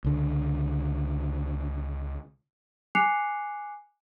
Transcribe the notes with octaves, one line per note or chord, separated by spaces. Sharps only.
C#2 D3
G#5 D6 F#6 C7 C#7 F7